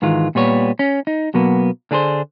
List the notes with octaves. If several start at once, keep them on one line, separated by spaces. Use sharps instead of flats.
G#2 D#3 E3 G#3 F4
A#2 G3 B3 C#5
C#4
D#4
B2 F#3 A#3 B3
D3 D4 G#4 B4 C5